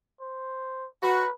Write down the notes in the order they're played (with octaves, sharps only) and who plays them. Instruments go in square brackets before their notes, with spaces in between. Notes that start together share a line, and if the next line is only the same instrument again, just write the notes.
[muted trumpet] C5
[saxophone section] F#4 [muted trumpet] B4